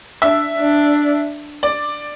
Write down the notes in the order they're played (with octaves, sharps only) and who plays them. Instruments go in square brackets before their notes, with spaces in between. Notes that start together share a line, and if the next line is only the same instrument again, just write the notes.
[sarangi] D4 [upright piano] E5
[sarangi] D4
[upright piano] D5